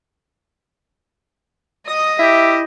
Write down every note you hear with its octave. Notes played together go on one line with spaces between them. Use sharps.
D#5 D#6
E4 G4 E5